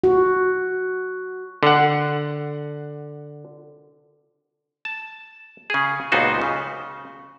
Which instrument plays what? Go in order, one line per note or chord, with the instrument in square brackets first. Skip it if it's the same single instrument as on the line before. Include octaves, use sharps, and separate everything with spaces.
[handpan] F#4
[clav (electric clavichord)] D3 F#5
A5
C#3 G#4
C#2 A#2 B3 D#4 F#4 C5
C#3